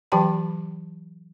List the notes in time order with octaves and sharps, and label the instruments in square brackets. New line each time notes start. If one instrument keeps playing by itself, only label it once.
[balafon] E3 F#3 G4 G5 A5 B5